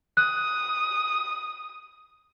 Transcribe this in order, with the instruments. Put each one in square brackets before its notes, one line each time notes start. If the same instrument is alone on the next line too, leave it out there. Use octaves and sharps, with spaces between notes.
[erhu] D#6 [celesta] F#6